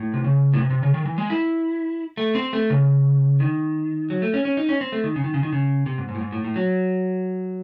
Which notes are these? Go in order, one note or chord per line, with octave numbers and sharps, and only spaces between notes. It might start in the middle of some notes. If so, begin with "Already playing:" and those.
Already playing: A2
C3
C#3
A2
C3
C3
C#3
D#3
E3
G#3
E4
A3
C4
A3
C#3
D#3
F#3
A3
C#4
C#4
D#4
C#4
C4
A3
D#3
C#3
D#3
C#3
D#3
C#3
C3
G#2
G#2
A2
G#2
A2
A2
F#3